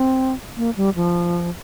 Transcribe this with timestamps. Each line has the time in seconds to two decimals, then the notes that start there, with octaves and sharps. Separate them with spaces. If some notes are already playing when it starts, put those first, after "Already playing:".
Already playing: C4
0.57 A#3
0.76 G3
0.96 F3